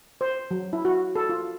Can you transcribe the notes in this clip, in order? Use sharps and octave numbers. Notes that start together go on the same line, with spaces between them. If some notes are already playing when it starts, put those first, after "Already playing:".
C5
F#3
E4
F#4
A4
F4